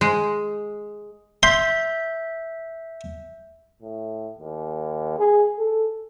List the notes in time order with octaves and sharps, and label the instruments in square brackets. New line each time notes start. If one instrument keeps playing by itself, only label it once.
[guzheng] G#3
[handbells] E5 G6 [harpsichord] C6
[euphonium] A2
D#2
G#4
A4